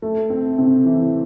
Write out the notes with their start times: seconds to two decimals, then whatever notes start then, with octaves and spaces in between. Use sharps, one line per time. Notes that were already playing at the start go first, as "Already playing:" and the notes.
0.02 A3
0.30 C4
0.58 C3
0.85 E3